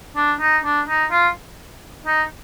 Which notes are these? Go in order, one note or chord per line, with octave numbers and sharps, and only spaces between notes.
D4
D#4
D4
D#4
F4
D#4